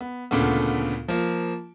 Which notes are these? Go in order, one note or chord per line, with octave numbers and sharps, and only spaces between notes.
B3
D2 A#2 C#3 A3 B3
F3 A#3